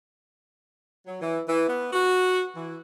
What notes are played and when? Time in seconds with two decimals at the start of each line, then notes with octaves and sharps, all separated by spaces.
1.07 F#3
1.21 E3
1.47 E3
1.67 B3
1.93 F#4
2.55 E3